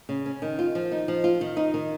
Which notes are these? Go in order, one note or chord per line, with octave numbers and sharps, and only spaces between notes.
C#3
C#4
D#3
F4
F3
D#4
F3
F4
D#3
D#4
D#3